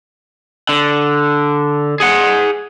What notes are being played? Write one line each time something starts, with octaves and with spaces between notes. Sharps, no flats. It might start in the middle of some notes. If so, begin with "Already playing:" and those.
D3
G#4 F#5